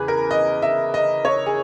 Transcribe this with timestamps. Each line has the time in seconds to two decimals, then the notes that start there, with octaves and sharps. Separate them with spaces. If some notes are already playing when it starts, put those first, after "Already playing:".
Already playing: E2 C#3 G#4 B4
0.08 A#4
0.31 D#5
0.62 E5
0.94 D#5
1.25 C#5
1.46 G#4